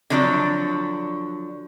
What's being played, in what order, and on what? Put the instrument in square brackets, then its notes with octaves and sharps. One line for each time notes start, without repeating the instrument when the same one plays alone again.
[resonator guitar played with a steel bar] D3 F3 F#3 D4 D5